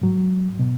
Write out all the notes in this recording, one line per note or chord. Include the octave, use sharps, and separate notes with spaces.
G#2 F#3
B2